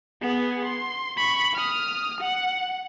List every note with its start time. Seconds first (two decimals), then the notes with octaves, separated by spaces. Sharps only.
0.22 B3 G#4
0.64 C6
1.17 B5 C#6
1.54 D#6 F6
2.21 F#5